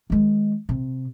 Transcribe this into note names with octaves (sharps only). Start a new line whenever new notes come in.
D#3 G#3
C3